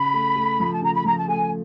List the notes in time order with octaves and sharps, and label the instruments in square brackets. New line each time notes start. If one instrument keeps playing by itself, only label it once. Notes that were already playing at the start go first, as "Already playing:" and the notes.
Already playing: [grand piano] C#3 [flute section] B5
[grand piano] A3
A3
F3
[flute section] A5
[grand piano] C#3 [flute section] A#5
[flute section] B5
[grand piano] F3 [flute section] A#5
[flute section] A5
[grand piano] A3 [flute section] G#5